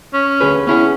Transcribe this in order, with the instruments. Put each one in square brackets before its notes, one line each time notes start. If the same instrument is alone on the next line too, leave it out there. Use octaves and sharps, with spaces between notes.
[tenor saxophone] C#4
[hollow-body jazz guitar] D2 G#4 B4
[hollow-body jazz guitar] B3 E4 G#4 [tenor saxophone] C#4